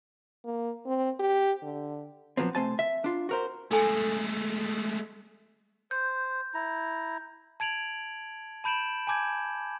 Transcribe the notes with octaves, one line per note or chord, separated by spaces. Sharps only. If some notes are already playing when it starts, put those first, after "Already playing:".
A#3
C4
G4
D3
A#2 F3 F#3 B3 C4
C3 A3 C4 C5 G#5 A5
E5
D4 F4
F#4 A#4 C5
G#3 A3 D#4 A4 G#5
C5 G6
E4 A#5
A5 G#6 D7 F7 F#7
A5 B5 G6 D7 E7 F#7
G#5 A5 D6 G6 G#6